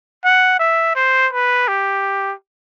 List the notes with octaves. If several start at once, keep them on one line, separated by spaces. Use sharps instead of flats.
F#5
E5
C5
B4
G4